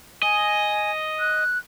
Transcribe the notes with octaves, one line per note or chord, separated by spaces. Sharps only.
D#5 G#5
F#6